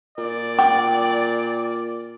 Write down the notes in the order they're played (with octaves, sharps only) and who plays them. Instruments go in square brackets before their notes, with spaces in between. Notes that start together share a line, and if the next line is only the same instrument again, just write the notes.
[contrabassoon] A#2 [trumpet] D5
[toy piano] G5 D6